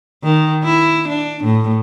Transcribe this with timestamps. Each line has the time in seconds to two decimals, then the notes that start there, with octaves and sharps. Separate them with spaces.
0.23 D#3
0.64 E4
1.08 D4
1.44 A2